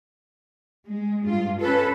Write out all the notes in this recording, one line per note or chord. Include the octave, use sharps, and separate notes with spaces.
G#3
G2 F4
C#4 A4 B4